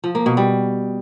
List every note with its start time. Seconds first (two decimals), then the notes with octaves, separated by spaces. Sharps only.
0.04 F3
0.15 A#3
0.26 B2
0.37 G3